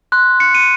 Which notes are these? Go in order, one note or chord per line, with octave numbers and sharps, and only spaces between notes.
C6 F#6
C#7
D#7